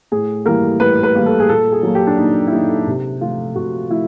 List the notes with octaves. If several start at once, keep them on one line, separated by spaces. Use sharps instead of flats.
A2 G#4
E3 G3 A#3 A#4
A2 B4
B4
E3 G3 A#3
A4
G#4
A#2 A4
G#4
F#3 A#3
G4
D4
A#2 D#4
E4
F#3 A#3 D#4
C3
F3 A3 F4
C3 F#4
F3 A3 E4